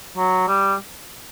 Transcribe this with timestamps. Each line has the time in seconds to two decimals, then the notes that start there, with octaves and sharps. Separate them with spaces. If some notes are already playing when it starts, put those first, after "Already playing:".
0.17 F#3
0.48 G3